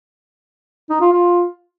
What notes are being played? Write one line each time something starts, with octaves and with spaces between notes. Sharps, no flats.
D#4
F4
F4